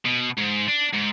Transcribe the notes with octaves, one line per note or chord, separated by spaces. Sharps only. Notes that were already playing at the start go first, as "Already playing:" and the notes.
B2
G#2
D4
G#2